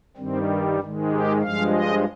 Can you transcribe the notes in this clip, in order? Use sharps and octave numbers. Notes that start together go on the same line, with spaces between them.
G2 D#3 G3 C4
G#2 D#3 G#3
G4
G2 F3 G#3 F5
D#5